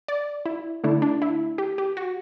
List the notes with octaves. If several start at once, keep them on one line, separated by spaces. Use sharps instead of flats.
D5
E4
D3 A3 D4 E4
D4
E4
G4
G4
F#4